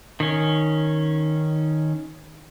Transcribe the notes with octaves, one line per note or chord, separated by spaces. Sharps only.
D#3 C#4